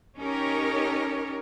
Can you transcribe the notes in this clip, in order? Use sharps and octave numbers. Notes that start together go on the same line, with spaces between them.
C#4 D#4 G4 A#4 C#5